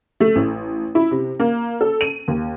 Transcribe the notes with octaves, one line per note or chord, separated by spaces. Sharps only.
A3
A1
E4
C3
A#3
A4
D#7
D#2